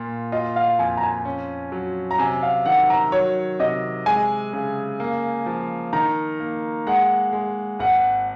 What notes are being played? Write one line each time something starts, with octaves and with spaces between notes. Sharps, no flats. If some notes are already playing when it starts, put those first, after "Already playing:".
Already playing: A#2 F4
F4 D#5
F5
F2 G#5
A#5
G#5
C#4
F#3
A#5
C3 G#5
F5
D#3 F#5
A#5
F#3 C#5
C3 D#5
G#3 G#5
C#3
A#3
F3
D#3 A#5
A#3
G#3 F#5
G#3
G#1 F#5